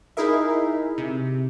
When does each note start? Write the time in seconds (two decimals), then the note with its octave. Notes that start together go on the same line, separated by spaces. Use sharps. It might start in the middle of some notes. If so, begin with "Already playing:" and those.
0.17 D#4 E4 G#4 A#4 E5
0.98 C3